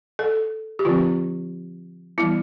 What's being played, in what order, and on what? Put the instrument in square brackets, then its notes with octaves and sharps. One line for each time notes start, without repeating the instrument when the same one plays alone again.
[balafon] A4
G4
D3 F3 C4 F4
E3 G3 B3 E4